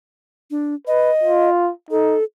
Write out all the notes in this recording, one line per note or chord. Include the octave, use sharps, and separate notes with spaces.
D4
B4 D#5
F4
D#4 A4